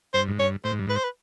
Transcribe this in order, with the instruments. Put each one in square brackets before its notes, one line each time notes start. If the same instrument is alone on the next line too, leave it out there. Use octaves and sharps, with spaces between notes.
[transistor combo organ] G2 [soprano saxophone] C5
[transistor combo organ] G#2
[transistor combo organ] G2 [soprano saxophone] C#5
[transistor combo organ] A2 [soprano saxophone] C5
[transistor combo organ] G#2
G2
[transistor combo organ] G#2 [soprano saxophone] B4
[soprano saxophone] C5
B4